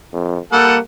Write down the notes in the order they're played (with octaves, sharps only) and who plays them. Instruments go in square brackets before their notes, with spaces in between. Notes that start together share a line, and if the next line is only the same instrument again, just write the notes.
[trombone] F2
[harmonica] G3 A4 F#5 [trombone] A#3